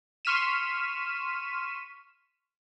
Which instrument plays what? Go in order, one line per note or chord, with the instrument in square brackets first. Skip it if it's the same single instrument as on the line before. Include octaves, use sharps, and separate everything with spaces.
[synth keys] C6 C#6 F6 B6 D#7 E7